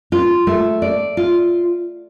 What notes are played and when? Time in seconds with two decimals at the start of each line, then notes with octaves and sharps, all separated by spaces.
0.12 F4
0.47 A3
0.82 D5
1.17 F4